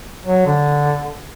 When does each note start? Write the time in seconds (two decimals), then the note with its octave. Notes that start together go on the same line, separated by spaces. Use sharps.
0.25 F#3
0.46 D3